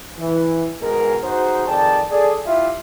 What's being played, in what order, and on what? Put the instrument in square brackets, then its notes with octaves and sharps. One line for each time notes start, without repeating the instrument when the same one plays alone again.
[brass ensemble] E3
G#2 B2 G#3 G#4 A#4
D#4 F#4 G#4 C5
F2 D#3 G#4 D5 G5 A5
G#4 A4 D5
E4 F4 G4 E5